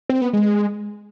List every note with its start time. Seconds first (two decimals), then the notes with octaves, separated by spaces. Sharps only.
0.09 C4
0.21 B3
0.33 G#3